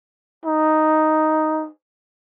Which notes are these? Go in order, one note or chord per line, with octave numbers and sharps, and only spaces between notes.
D#4